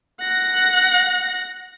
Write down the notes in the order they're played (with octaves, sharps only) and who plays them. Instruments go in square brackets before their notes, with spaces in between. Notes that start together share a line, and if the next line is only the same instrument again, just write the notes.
[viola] F#5 [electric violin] A#6